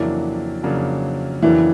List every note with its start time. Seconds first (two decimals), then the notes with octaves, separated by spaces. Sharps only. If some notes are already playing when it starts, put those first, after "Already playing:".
Already playing: F2 C#3 E3 F#3 A#3 D4
0.63 F2 C#3 F#3 A#3 D4
1.42 F2 C#3 E3 F#3 A#3 D4